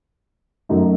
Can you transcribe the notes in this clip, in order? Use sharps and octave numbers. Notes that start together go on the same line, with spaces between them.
F#2 F#3 A3 D#4